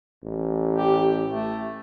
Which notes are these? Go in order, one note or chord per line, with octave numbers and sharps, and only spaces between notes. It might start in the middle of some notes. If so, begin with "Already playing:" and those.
A1
G4
A3